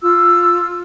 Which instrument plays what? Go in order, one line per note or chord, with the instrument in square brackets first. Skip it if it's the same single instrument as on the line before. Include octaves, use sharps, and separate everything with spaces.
[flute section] F4 E6